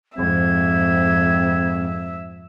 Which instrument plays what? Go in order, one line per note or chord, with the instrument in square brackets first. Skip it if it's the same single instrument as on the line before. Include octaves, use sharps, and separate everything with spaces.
[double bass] F2 G#2 [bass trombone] C4 [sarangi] E5 [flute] G#6